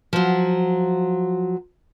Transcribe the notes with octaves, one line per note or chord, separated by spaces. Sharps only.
F3 F#3